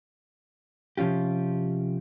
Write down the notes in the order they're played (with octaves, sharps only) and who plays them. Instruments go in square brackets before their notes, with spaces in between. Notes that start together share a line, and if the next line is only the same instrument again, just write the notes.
[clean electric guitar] C3 F3 C#4 F4 G4